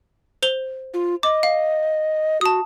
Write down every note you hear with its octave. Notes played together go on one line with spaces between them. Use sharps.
C5 F7 G7
F4
D#5 D6
F5
F#4 A5 D#6